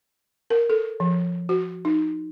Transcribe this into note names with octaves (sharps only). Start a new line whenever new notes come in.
A#4
A4
F3
F#4
D#4